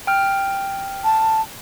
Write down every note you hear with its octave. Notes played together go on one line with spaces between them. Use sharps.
G5 F6
A5